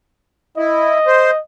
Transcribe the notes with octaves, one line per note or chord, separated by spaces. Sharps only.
E4 D#5
C5